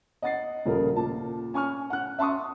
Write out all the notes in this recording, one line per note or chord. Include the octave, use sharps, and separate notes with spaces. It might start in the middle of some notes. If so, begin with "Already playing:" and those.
D#5 F#5 A6 C7
D#1 C#3 F3 A3 A#4
A#2 A5
C#4 G#5 C#6 F6
F#5 F#6
E5 A5 C6 C#6 D#6